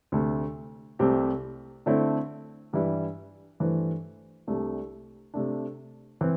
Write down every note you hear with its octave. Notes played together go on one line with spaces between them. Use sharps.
D2 C3 A3
C2 C3 A3 C4 G4
D3 A3 C4 E4 A4
G2 E3 G3 E4
G2 E3 A3 E4 C5
C2 C3 A3 D4 G4
C3 A3 D4
E3 C4